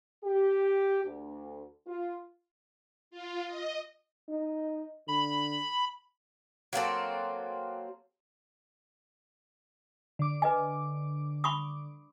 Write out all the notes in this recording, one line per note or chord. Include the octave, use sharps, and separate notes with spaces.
G4
D2
F4
F4
D#5
D#4
D3 B5
F#3 A#3 C4 A4
D3 D6
B4 D#5 G#5
B5 C#6 D#6